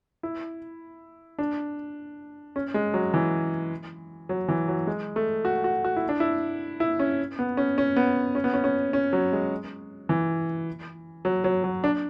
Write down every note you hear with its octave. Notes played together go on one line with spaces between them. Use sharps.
E4
D4
C#4
G#3
F#3
E3
F#3
E3
F#3
G#3
A3
F#4
F#4
F#4
E4
D4
E4
E4
C#4
B3
C#4
C#4
B3
C#4
B3
C#4
C#4
C#4
F#3
G#3
E3
F#3
F#3
F#3
D4